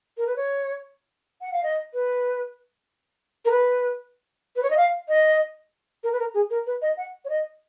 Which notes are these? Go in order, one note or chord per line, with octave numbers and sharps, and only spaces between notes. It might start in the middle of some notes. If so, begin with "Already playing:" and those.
A#4
B4
C#5
F#5
F5
D#5
B4
A#4
B4
B4
C#5
D#5
F5
D#5
A#4
B4
A#4
G#4
A#4
B4
D#5
F#5
C#5
D#5